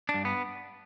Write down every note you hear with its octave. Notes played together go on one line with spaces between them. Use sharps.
D4
G2
B3